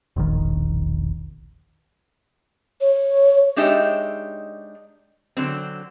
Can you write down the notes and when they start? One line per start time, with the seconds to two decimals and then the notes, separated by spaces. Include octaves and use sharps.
0.16 E1 A#1 D#3
2.81 C#5
3.56 G#3 D4 D#4 G4 C#5 E5
5.37 D3 F#3 C4